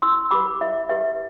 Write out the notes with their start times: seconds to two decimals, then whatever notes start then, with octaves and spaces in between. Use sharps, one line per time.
0.02 E4 C6 E6
0.31 G4 B4 B5 D6
0.61 E4 E5
0.89 G4 B4 E5